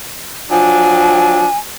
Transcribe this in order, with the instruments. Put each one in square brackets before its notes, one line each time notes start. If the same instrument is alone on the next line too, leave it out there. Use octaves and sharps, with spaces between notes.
[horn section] F3 F#3 D4 [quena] G#5